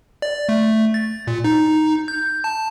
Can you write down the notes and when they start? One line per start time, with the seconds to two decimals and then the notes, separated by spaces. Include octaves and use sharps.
0.22 D5
0.49 A3
0.94 A6
1.27 A#2
1.44 D#4
2.08 G6
2.44 A5